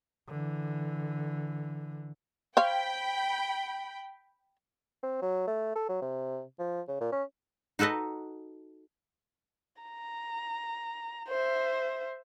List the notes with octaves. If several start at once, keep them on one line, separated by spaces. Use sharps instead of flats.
D3 E3
C5 C#5 F5 G5 B5
C4
F#3
A3
A4
F#3
C3
F3
C#3
A#2
C#4
D#4 F#4 A4 B4 D#5
A#5
C5 E5